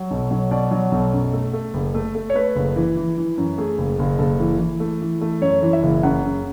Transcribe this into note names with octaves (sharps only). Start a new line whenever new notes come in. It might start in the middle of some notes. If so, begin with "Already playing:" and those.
Already playing: F#3
B1
F#3
B2 D5
F#3
B1
F#2
A3
A3
F#1
A3
A3
C#5
A3 B4
F#1
E3
E3
E3
F#2
A3 G#4
F#1
F#1
F#1 A4
E3
E3
A3
E3
A3
F#2 C#5
E3
E5
F#1
F#2 F#5
C#3